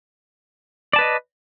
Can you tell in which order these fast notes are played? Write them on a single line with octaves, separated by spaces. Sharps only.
D5 A5 B4 D#5